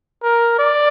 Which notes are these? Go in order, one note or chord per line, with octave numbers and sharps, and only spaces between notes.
A#4
D5